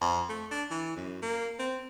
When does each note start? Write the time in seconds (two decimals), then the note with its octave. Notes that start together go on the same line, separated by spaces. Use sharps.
0.01 F2
0.29 A3
0.51 D4
0.71 E3
0.96 F#2
1.22 A#3
1.59 C4